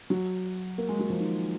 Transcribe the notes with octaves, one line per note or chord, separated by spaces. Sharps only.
F#3
A#3
G#3
F#3
F3
D#3